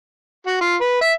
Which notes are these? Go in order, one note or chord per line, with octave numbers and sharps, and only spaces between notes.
F#4
F4
B4
E5